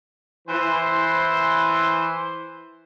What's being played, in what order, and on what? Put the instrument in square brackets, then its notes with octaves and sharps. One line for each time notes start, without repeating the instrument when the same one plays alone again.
[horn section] E3 C5